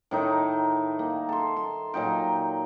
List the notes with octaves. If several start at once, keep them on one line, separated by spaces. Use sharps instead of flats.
A2 D#3 D#4
A#3
A4 C6
C6
A#2 F#3 D#4 G5